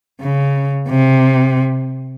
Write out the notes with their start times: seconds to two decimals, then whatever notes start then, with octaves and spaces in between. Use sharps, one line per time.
0.21 C#3
0.88 C3